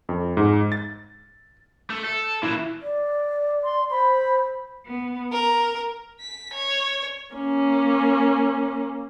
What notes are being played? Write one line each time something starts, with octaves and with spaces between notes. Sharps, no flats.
F2
G#2
A6
A3
A4
A#2 E3 E4
D5
C6
C5 B5
B3
A#4
B6
C#5
A#3 C#4